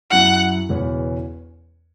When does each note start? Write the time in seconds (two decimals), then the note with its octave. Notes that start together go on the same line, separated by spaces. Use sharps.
0.11 F#2 F#3 E4 F#5
0.69 E1 E2 C#3 E3 C#4